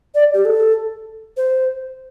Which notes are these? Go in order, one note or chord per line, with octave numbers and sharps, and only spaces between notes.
D5
G4
A4
C5